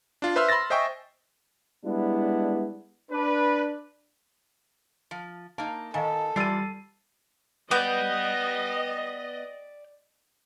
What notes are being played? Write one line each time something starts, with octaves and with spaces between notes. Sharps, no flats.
D4 F4
B4 C5 E5 C6 E6 F6
B5 C6 E6 A6 A#6
C5 D#5 E5 G5 G#5 C#6
G3 G#3 B3 D4 E4
D4 B4
F3
A#3 D#4 A5
D#3 A4 D#5 F5 G#5
E3 G3 F4 D5 E6 A6 C7 D#7
B3 D5 D#5 G5 G6